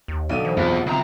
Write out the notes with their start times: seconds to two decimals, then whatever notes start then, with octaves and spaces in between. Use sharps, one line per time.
0.08 D#2
0.29 B1 D3 D5 D#6 D#7
0.45 E3 C5
0.57 B1 F2 E3 B3 F4
0.86 C#2 C4 E5 A#5